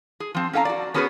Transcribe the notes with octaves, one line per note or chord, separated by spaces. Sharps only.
G#4
F3 C4
C#4 A4 F5 G5 A#5
F#4 D5
B3 C#4 F#4 G#4 A4 B4